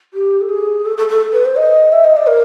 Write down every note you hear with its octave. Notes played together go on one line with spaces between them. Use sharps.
G4
A4
G#4
A4
A4
A4
B4
C5
D#5
E5
D#5
D5
A#4